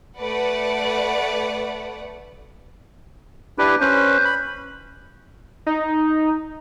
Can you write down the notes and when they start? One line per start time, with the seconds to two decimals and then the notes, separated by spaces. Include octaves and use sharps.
0.19 A3 B4 D5 F#5
3.58 D4 E4 G4 B4
3.81 C#4 B4 C5
4.25 B5
5.66 D#4